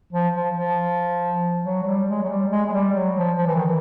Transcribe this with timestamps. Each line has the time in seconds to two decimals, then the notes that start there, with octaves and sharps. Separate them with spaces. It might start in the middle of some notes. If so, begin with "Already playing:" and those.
0.13 F3
0.34 F3
0.56 F3
1.65 F#3
1.82 F#3
1.86 G3
2.08 G#3
2.24 F#3
2.29 G3
2.51 G#3
2.66 G#3
2.73 G3
2.95 F#3
3.16 F3
3.38 F3
3.47 E3
3.56 D#3
3.65 E3